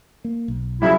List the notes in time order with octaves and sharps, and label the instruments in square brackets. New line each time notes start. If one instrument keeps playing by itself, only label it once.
[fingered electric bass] A#3
B1
[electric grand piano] C#3 F#3 G3 [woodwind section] E4